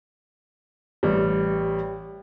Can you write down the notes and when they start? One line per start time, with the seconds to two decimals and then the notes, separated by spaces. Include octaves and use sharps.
1.03 A1 G3